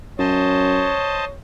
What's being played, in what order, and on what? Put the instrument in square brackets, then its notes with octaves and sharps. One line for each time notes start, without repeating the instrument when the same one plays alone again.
[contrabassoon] F#2 [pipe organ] C5 D#5 A5 [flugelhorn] C#5